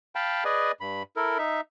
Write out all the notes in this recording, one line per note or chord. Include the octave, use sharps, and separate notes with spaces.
F5 G5 A5 B5
G#4 B4 D5 D#5 G#5
G2 B5
E4 A4 A#4
D#4 E5